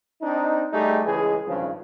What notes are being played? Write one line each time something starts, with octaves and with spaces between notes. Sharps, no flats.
C4 D4 D#4
G3 A3 D#4 G4 G#4
C#2 E3 G#3 G#4
G#1 G2 C#3 F3